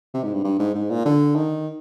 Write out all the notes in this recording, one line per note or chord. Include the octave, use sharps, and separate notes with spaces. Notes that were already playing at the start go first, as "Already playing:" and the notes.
C3
G#2
G2
G2
G#2
G#2
A#2
D3
D#3